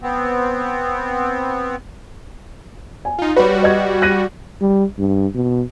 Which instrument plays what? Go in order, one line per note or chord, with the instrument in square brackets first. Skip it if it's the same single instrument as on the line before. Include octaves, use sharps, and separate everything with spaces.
[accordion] B3 C4
[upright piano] G#5
[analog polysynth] D#4 F4
[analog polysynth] G3 F#4 [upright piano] B4 C#5
[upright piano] B4 D#5 G#6
F#6 A#6 D#7
[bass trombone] G3
G2
B2